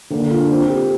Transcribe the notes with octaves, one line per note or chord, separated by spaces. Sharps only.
D3 A#3
F4
C4
G4